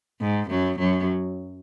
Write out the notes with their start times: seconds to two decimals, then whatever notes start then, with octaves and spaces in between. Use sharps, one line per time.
0.21 G#2
0.50 F#2 F#3
0.79 F#2 F#3